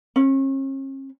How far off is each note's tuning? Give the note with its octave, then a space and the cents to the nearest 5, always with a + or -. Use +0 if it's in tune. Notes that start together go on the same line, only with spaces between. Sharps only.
C#4 -45